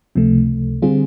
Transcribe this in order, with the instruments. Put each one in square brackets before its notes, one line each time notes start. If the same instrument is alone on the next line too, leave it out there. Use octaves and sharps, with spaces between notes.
[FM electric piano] C#2 C3 F3 A3
D3 G3 C4 F4 G#4